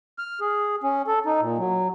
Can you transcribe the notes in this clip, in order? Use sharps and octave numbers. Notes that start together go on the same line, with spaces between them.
F6
G#4
C#4
A4
D#4
A#2
F#3